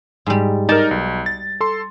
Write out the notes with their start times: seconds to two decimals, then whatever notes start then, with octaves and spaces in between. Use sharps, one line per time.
0.26 G#2 G3
0.69 D#4 A#4 D5 A5
0.91 B1
1.26 A6
1.61 A4 C6